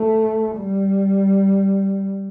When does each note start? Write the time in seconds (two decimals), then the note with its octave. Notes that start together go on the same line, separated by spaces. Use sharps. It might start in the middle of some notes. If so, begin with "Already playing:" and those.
Already playing: A3
0.58 G3